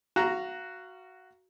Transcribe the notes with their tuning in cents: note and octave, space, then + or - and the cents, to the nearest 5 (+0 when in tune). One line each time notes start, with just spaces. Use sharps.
F#4 +0 F5 -25 A#5 +0